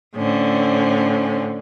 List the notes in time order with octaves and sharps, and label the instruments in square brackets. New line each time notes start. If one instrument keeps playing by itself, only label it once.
[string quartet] A2 D3 C4 C#4